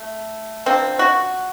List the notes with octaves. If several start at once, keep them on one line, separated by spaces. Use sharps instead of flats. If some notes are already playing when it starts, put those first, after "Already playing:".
Already playing: A3
D3 F3 A#3 C4
F#4